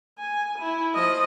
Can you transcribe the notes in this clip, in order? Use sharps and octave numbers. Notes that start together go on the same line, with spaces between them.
G#5
E4
F3 D#5